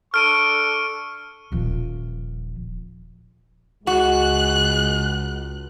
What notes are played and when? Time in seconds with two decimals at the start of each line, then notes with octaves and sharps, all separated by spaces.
0.14 D4 A4 C#6 F6 D7 D#7
1.52 D#1 F3
3.87 C#2 G#3 F#4 F#6